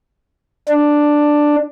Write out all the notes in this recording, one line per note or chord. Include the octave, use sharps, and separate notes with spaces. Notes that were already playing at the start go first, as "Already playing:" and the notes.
D4